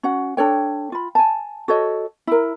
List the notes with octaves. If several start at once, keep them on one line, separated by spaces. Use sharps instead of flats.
C#4 F#4 F#5
D4 A4 C#5 G5
F4 B5
G#5 A5
F#4 A4 C#5 D#5
E4 A#4